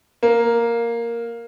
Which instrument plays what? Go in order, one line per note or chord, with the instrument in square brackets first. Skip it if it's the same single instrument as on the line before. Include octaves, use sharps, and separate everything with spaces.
[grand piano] A#3